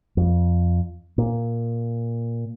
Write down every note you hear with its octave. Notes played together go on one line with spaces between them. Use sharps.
F2
A#2